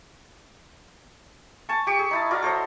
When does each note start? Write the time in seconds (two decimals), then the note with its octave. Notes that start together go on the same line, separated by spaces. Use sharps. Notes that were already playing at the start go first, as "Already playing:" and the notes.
1.69 G#5 A5 C#6
1.87 G4 C#6
1.99 G#4
2.11 D#4 E4 A5
2.31 E4 F#4 A#4 D5
2.43 A4 C5 C#5 D#5